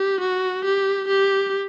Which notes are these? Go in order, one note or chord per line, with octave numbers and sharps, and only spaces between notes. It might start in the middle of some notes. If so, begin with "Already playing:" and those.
Already playing: G4
F#4
G4
G4